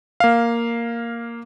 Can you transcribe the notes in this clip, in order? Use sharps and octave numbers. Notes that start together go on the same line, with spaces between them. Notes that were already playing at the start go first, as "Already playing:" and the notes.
A#3 F5